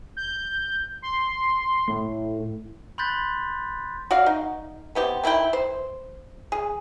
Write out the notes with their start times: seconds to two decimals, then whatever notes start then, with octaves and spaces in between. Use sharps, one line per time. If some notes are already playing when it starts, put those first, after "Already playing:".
0.17 G6
1.02 C6
1.88 A2
2.98 B5 C6 F#6 G6 A6 B6
4.11 F#4 D5 F5
4.26 D#4
4.95 B3 C4 G4
5.24 D#3 E4 F4 G5
5.53 C5
6.52 G#4